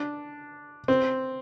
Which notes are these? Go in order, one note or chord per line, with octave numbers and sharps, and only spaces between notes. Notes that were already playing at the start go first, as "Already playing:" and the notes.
Already playing: D4
C4